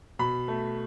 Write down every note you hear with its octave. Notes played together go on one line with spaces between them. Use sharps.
B2 B5
A3